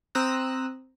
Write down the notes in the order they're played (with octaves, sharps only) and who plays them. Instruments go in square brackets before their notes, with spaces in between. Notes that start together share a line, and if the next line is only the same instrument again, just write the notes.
[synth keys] C4 A#5 D#6 E6 F#6